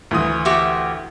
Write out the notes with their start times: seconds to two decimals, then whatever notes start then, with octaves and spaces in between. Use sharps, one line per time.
0.11 D2 E3 D#6
0.45 F#4 G4 E5